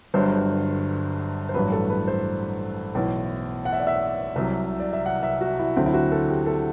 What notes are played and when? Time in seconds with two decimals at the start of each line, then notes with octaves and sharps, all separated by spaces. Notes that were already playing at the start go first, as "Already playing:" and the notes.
0.14 G1 G2 D3 F#3 C5
1.49 C5
1.54 A1 G2 F#3 B4
1.72 A4
1.90 B4
2.08 C5
2.95 B1 A2 E3
3.65 F#5
3.73 E5
3.80 D5
3.87 E5
4.36 C2 C3 F#3
4.80 D5
4.93 E5
5.06 F#5
5.23 E5
5.41 F#4
5.59 E4
5.76 D2 D3 F#3 C4
5.86 E4
5.94 F#4
6.12 A4
6.28 G4
6.46 A4